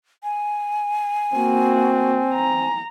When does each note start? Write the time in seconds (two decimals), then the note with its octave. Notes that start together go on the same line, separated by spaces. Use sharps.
0.24 G#5
1.33 A#3 C4 F#4
2.34 A#5